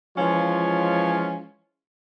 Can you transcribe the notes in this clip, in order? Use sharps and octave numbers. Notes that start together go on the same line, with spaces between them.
E3 F3 G#3 C#4 F4 C#5